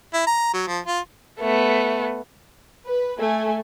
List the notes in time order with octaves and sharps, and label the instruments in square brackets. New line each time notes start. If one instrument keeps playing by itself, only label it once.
[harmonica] E4
A#5
F#3
F3
F4
[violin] A3 B3
[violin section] B4
A3 G#5